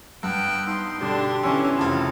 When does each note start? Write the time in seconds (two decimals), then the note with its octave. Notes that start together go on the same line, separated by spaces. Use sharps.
0.23 G2 B3 G5 E6 F#6
0.67 D#4 C6
1.00 B2 D3 D4 G4
1.43 D3 E3 C#4 C#5 G#5 E6
1.77 F1 C#3 B3 C4 E4 F4 A5 E7